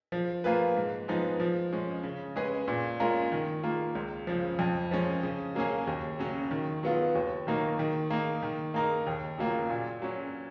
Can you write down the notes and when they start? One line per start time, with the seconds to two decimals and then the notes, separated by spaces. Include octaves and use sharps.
0.12 F3
0.44 A#3 F4 G#4 B4
0.76 G#2
1.08 F3 G#3 B3 D#4
1.40 F3
1.73 G#3 C#4
2.03 C#3
2.36 G#3 C#4 G#4 B4
2.68 A#2
3.00 G#3 C#4 F4 A#4
3.32 D#3
3.64 A#3 F4
3.95 C#2
4.27 C#3 F3
4.59 F2
4.91 F3 G#3 C#4
5.23 C#3
5.55 F#3 A#3 C#4 G#4
5.87 D#2
6.19 C#3 F#3 C#4
6.51 D#3
6.83 F#3 B3 F4
7.15 D#2
7.47 D#3 F#3 A#3 D#4
7.79 D#3
8.10 A#3 D#4
8.43 D#3
8.74 A#3 D#4 A#4
9.07 D#2
9.38 C#3 F#3 A#3 F4
9.70 A#2
10.02 F#3 C#4